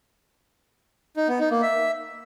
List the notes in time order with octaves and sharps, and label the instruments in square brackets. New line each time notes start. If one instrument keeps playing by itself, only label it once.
[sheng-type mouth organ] D#4
B3
D#4
A#3
E5